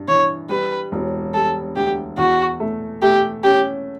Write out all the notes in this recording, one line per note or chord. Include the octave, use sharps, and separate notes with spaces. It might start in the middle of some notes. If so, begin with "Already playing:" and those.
Already playing: G2
E3 C#5
G3 B4
E1
G3 A4
D2 G4
E2 F#4
A3
A3 G4
C#4 G4